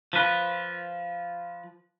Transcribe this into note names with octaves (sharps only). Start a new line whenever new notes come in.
F3 B4